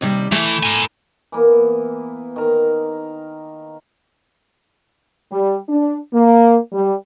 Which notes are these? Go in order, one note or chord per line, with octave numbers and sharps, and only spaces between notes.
D#2 C3 G3
E3 A3 E4
A#4 G#5
E3 A#3 B3
D#3 A#4
G3
D4
A#3
G3